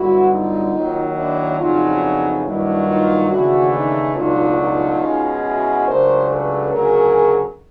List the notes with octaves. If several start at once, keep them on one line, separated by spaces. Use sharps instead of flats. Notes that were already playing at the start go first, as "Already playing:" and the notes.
Already playing: G2 D3 F#3 B3 E4 F#4
D#4 F4
D#2 D#3 F#3
D4 E4
F2 C#3 F#3 B3 D4 D#4 F4
D#4
G2 D#3 F#3 A#3 D4 E4
D#4 F4
D#2 C#3 E3 A3 D4 E4 F#4
D#4
C#2 B2 F#3 A3 D4 D#4 F4
D#4 F4
B2 G#3 C#4
E4 F#4
C#2 C#3 F#3 A3 D4 A#4 C5
A4 B4
D2 C#3 F#3 A3 C#4 G#4 A#4